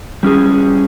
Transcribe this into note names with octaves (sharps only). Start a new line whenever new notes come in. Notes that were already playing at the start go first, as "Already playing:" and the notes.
G3 C#4 G#4